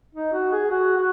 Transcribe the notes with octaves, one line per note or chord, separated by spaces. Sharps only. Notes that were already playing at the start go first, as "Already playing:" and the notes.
D#4
F#4
G#4
F#4
F#4